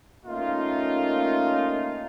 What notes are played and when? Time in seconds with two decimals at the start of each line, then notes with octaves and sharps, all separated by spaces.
0.25 A3 A#3 C#4 D#4 F4